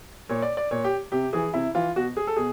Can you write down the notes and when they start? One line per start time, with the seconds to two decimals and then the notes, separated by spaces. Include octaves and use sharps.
0.29 A#2 C#5
0.42 D5
0.57 D5
0.71 A#2 C#5
0.84 G4
1.12 C3 G4
1.33 E3 G#4
1.53 C3 E4
1.75 E3 F4
1.96 B2 F#4
2.17 G#4
2.27 A4
2.37 B2 G#4